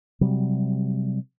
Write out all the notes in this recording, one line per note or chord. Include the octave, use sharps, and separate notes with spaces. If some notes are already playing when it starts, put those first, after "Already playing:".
C3 F#3 G3